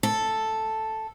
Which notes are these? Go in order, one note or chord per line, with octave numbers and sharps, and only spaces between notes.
A4